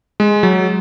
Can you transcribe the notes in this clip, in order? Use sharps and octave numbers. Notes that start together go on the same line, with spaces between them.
G#3
F#3